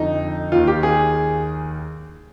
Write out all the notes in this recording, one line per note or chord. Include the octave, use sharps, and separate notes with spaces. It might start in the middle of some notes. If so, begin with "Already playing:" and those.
Already playing: F2 D3 F3 D#4
D#2 D#3 F4
G4
G#4